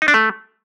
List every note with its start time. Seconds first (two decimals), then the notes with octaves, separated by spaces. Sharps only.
0.02 D#4
0.08 D4
0.14 A3